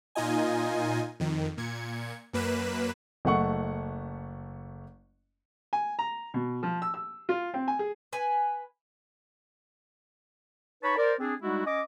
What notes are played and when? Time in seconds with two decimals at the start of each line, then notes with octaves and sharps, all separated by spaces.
0.15 A#2 D#4 F4 D#5 G#5
1.20 F2 D#3
1.57 A#2 G#6 C#7
2.33 F#2 A#3 B4 F#6 B6 E7
3.25 F#1 A3 F#5 C#6
5.73 G#5
5.99 A#5
6.34 B2
6.63 F3
6.82 E6
6.94 E6
7.29 F4
7.54 C4
7.68 G#5
7.79 G#4
8.13 B4 G#5
10.83 D#4 B4 C#5 A5 B5 C#6
10.97 A#4 C5 D5
11.20 C4 D4 G#4
11.42 G3 G#3 D#4 E4 F#4
11.66 C#4 D#5 D6